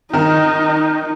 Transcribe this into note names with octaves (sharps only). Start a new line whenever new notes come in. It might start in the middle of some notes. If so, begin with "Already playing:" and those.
D#3 D#4 A#4